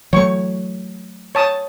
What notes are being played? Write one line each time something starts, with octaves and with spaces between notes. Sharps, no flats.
E3 F#3 A3 C#5 C#6
C#5 A5 D#6